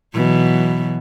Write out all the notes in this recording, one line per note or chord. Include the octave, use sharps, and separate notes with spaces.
B2 E3 F#3